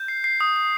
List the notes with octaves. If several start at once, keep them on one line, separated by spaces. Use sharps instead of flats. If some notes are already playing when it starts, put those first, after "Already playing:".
Already playing: G6
C7
C7
D#6
D#6